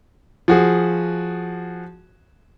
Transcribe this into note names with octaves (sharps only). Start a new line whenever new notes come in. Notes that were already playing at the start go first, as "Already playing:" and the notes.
F3 F#4 G#4